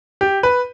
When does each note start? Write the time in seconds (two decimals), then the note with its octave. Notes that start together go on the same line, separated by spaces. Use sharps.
0.21 G4
0.43 B4